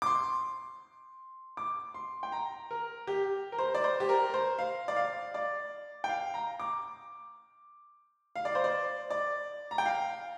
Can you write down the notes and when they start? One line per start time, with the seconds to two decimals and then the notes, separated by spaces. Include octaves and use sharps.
0.02 D6
0.06 C6
1.57 D6
1.94 C6
2.23 G5
2.32 A#5
2.71 A#4
3.07 G4
3.52 A#4
3.58 C5
3.75 D5
3.84 C5
4.00 G4
4.09 A#4
4.34 C5
4.58 F5
4.88 D5
4.96 F5
5.34 D5
6.04 G5
6.09 F5
6.34 A#5
6.60 D6
8.36 F5
8.45 D5
8.55 C5
8.64 D5
9.10 D5
9.71 A#5
9.78 G5
9.86 F5